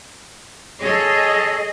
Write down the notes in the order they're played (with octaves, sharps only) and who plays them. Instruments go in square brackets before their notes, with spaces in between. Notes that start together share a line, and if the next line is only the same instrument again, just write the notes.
[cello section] G#4 D#5 [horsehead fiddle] A4 C#5